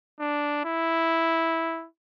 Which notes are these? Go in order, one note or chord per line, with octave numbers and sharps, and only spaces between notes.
D4
E4